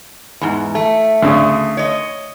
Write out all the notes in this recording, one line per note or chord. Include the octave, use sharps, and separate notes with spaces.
E2 G#2
A3
D2 C#3
C#5 D#5